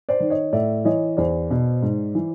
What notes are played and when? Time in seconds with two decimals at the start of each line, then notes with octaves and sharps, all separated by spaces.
0.09 C5 D5
0.20 D#3
0.30 C#5 D#5
0.53 A2 D5 E5
0.85 E3 C#5 D#5
1.17 E2 C5 D5
1.51 B2
1.82 G#2
2.15 E3